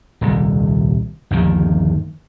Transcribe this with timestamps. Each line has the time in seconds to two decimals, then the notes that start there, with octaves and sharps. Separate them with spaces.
0.21 D#1 C2
1.31 G1 D#2 D#3 F3